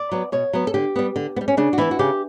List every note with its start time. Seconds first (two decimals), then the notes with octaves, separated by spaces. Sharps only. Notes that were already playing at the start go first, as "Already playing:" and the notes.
Already playing: D5
0.12 F#3 B3
0.32 B2 C#5
0.53 F#3 B3
0.67 A4
0.74 D3 G4
0.96 G3 B3
1.16 D3
1.36 B3
1.41 G3
1.48 C#4
1.57 C#3 D4
1.73 F#4
1.78 E3 B3 E4
1.91 F#4
1.99 C#3 G4